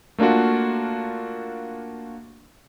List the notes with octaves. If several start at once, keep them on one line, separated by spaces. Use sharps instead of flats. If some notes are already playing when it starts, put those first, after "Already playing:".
A3 A#3 D4 F4 F#4